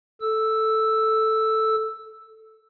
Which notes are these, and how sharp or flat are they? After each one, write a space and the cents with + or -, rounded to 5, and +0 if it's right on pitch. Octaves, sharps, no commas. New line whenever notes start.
A4 +0 E6 +0